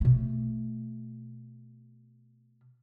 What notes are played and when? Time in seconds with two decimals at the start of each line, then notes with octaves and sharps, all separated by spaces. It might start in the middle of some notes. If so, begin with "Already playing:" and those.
0.01 B2 A3